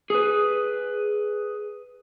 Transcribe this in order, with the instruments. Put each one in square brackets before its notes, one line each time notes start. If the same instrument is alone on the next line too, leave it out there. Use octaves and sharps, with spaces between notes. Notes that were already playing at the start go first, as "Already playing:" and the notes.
[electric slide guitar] G#4 B4